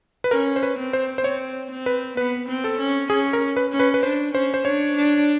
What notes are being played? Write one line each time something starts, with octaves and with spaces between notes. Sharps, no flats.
B4
C#4 A#4
C5
B4
C4
C5
C5
C4 C#5
C4
B4
B3 B4
C4
A4
C#4
C#4 G#4
A#4
B4
C#4
B4
B4
D4 C5
C#4 C5
C5
D4 C#5
D4